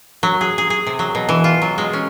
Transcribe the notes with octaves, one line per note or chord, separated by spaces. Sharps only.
F#3
G#4
G#4
G#4
C3
F#3
B2
E3
F4
F#3
G#3
C#4